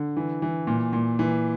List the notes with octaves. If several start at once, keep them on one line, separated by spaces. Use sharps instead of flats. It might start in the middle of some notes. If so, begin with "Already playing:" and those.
Already playing: D3
E3
E3
A#2
A#2
E3